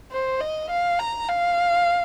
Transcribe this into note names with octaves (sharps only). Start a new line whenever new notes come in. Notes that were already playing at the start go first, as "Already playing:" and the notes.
C5
D#5
F5
A#5
F5